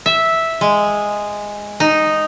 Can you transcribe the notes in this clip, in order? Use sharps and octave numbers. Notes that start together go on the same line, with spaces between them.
E5
G#3
D#4